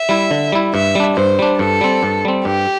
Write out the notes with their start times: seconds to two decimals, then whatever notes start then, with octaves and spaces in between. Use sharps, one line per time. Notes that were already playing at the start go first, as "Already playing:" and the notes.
Already playing: E5
0.09 G3 E4
0.31 D3
0.52 G3 E4
0.74 G2 E5
0.95 G3 D4
1.16 G2 C5
1.39 G3 D4
1.59 G2 A4
1.81 G3 C4
2.03 G2
2.25 G3 C4
2.45 G2 G4